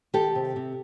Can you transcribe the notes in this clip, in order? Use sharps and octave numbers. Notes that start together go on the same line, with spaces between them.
D#3 G4 A4
C3
C3